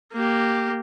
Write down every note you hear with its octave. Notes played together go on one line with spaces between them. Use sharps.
A#3 G4